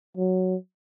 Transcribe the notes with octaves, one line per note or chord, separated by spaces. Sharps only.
F#3